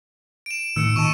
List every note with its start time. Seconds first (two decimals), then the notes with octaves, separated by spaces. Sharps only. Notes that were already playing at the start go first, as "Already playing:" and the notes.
0.46 D7 E7
0.76 A2 D#3 E6 C#7
0.96 A#2 D#4 A5 C#6 D#7 E7